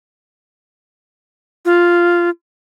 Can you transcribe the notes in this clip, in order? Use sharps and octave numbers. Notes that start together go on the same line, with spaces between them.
F4